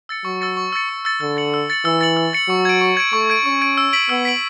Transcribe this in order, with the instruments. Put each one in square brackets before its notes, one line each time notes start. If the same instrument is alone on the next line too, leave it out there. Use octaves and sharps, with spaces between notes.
[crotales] E6 A6 C#7
[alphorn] F#3 [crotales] C#6
[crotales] E6 A6 C#7
C#6
E6 A6 C#7
C#6
E6 A6 C#7
[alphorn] D3 [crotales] E6
[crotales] A6 C#7 F#7
E6
A6 C#7 F#7
[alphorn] E3 [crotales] E6
[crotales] A6 C#7 F#7
E6
A6 C#7 F#7
[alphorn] F#3 [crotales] C#6
[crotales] G#6 D7
C#6
G#6 D7
[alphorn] A3 [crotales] C#6
[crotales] G#6 D7
[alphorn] C#4 [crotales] C#6
[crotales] G#6 D7
E6
B6 D7 F#7
[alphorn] B3 [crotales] E6
[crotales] B6 D7 F#7